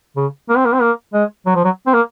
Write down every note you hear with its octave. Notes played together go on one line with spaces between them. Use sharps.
C#3
A#3
C4
A#3
C4
A#3
G#3
F#3
F3
F#3
C4
A#3